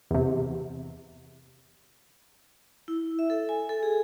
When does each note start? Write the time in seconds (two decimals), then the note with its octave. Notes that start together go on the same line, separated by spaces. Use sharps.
0.11 E2 C3
2.88 E4
3.19 E5
3.30 A4
3.49 G#5
3.69 A4
3.83 G#4